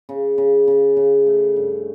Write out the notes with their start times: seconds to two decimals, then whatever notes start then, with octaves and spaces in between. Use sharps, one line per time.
0.09 C#3
0.38 C#3
0.68 C#3
0.97 C#3
1.27 A3
1.56 G2